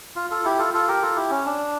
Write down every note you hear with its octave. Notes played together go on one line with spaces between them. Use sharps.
F4
F4 A4
E4 G4
F4 A4
F4 A4
G4 A#4
F4 A4
E4 G4
C#4
D4